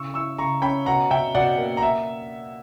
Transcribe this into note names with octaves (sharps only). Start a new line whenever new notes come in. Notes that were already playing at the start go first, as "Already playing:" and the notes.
Already playing: C#3 E4 C#6 E6
E4 C#6 E6
C#3 A#5 C#6
C#4 G5 B5
B2 F#5 A#5
B2 E5 G5
B2 D5 F#5
A#3
A#5
E5